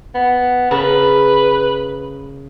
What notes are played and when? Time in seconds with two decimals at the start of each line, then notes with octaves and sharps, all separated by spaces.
0.15 B3
0.71 C#3 A#4 B4 A5